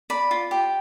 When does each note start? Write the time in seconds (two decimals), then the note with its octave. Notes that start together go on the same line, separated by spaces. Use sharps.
0.10 D5 B5
0.31 F4
0.51 G4